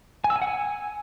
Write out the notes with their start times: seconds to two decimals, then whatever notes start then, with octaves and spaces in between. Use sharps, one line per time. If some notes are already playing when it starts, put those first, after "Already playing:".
0.24 G#5
0.30 E6
0.36 G#5
0.42 F#5
0.47 G#5